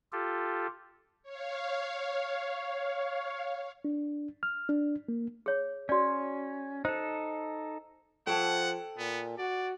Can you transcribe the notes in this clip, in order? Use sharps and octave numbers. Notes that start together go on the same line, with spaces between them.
F4 G4 A4
C#5 F5
D4
F6
D4
A#3
G#4 C#5
C#4 F#4 D5
D#4 A4 C5
F3 A4 F#5 G5
A#2 B3
F#4 D5